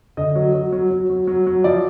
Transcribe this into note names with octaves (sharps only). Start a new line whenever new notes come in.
D3 D#5
F#3
F#3
F#3
F#3
F#3
F#3
F#3
F3 D5